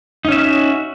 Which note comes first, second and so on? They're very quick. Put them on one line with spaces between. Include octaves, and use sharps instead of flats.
D#4 C#4 E5 F#4